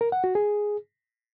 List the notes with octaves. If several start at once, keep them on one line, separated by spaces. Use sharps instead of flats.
A#4
F#5
F#4
G#4